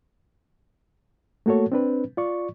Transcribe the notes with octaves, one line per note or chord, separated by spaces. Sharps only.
A3 A#3 F#4 A4 C#5
C4 D4 B4
F4 D5 C#6